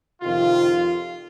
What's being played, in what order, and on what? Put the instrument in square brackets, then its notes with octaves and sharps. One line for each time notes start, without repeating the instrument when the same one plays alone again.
[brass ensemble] F2 C3 D#3 F4